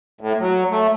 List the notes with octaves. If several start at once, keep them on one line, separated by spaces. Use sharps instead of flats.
A2
F#3
A3